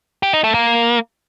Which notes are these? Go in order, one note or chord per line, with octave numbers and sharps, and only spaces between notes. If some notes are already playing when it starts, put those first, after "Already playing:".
G4
D#4
A3
A#3